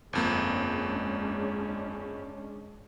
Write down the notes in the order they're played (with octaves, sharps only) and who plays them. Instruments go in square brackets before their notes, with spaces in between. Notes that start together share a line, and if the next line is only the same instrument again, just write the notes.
[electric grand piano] G1 F2 A#3 [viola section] G#3 C#4 D4